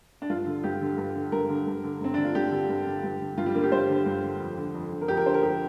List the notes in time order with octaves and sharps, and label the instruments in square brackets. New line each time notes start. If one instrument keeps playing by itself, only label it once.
[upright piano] D4
G2 F4
D3
G2 G4
D3
G2
D3
G2 A#4
D3
G2
D3
G2 C4
D3 D4
F4
G2 G4
D3
G2
D3
G2
D3
G2 F4
G3
D3 A#3
G4
G2 C5
D3
G2
D3
F2
D3
F2
D3
A#4
F2 G4
A#4
D3 C5
A#4
F2 G4